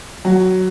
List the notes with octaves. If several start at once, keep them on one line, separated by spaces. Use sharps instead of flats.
F#3